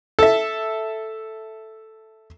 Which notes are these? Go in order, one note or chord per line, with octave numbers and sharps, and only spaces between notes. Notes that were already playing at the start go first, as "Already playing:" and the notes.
A4 E5